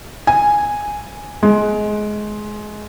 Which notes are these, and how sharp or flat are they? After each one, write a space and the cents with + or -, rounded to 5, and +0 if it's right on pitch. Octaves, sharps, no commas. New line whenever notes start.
G#5 -5
G#3 +20